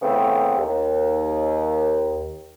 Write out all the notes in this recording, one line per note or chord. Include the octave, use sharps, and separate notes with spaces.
C#3 E3 A3 B3 C4
D#2